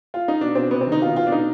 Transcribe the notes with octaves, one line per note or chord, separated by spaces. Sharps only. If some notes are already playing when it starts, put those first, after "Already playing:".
F4
D#4
B2 D4
B2 C4
C3 B3
C4
D#3
D#4
B2 F4
B2 F4
D4
B2 D#4